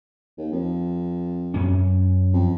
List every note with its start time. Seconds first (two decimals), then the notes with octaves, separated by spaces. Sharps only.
0.38 D#2
0.52 F2
1.54 F#2 C#4
2.33 F2